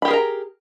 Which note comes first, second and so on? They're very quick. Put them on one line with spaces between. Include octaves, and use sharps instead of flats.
B5 G4 G#4 A#4 A#5